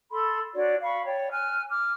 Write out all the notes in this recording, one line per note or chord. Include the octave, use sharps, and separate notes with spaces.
A4 B5 C6
D4 F#4 C#5 D5
F5 B5 C#6
C#5 D5 G5
G#5 F6 F#6
D6 F6